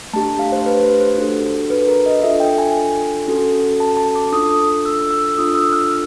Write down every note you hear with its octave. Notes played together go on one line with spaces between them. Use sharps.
A3 D4 G4 A5
F5
C5
B4
C5
C5
D4 F#4 A4
B4
A#4
D#5
D4 F4 A4 E5
G5
G#5
C#4 F#4 A4
A5
A5
D6
D4 F4 A4 D#6
E6
E6
D4 F4 A4 D#6
E6
F6